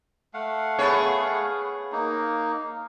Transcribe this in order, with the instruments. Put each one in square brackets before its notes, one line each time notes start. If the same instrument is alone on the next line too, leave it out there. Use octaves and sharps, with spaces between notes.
[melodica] A3 F5 F#5
[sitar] B3 G#4 C#5
[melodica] A#3 D#4